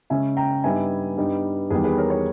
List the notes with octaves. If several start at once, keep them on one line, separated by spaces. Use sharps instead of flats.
C#3 G#3 C#4 E5 G#5
G5 A#5
G2 G3 B3 D#4 E5 G#5
G2 G3 B3 D#4
E2 D#3 G3 G#4 B4
G#4 B4
A#4 C#5
A#4 C#5